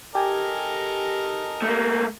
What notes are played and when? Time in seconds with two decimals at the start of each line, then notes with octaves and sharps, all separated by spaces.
0.15 G4 A4 A#4 D#5 G#5
1.62 A3 A#3